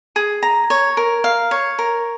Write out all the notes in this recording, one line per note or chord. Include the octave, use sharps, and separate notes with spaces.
G#4
A#5
C#5
A#4
F5
C#5
A#4